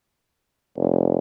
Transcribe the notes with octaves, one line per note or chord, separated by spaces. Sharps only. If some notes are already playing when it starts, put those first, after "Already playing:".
F1